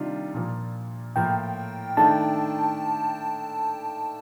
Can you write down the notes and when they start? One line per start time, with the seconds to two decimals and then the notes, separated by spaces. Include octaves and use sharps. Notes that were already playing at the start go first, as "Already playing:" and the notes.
Already playing: C3 D#3 G3 D4 F4
0.34 A#2 F3 A#3
1.16 A2 F3 A#3 G5
1.97 D#3 A3 D4 A5